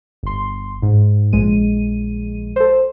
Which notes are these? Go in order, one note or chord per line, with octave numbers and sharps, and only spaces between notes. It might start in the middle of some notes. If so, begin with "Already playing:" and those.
G1 C6
G#2
A#1 G#3 D#7
A4 C5